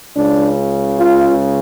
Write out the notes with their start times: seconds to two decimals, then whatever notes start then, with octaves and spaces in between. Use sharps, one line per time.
0.15 C#2 C#3 D4
0.97 F4